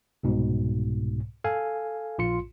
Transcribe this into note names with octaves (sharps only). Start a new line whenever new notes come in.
C2 G#2 B2
A4 F5 G#5
A#1 F4 C6 C#7